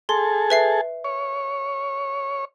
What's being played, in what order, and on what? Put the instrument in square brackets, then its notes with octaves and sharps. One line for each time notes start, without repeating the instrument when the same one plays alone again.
[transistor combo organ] G#4 A4 [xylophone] C6
[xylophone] B4 E5 C7
[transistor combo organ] C#5